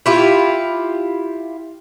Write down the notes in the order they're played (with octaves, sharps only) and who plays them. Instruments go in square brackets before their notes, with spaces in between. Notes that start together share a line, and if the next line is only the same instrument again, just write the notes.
[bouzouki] E4 F4 G4